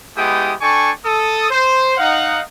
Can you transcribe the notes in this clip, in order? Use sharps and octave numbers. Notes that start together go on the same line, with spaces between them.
G#3 B3 E4 G4 G5 D#6
D4 A4 G5 G#5 C#6
A4 D#6
C5
D#4 F5 F#5